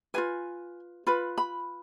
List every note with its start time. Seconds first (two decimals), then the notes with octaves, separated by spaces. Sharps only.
0.14 F4 G#4 B4 G#5
1.07 F4 B4 B5
1.38 B5